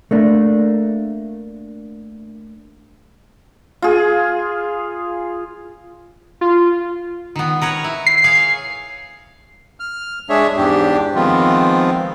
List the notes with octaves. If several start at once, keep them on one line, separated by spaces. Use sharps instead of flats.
A3 A#3 D4
F4 G#4
F4
D#3 B3
A#4 B4 C#5
E4
C7
G#4 C#5 F5
F6
G#3 D4 G#4 C#5 E5
E2 G#2 D4 G4
D#3 F3 G#3 B3 C4 F4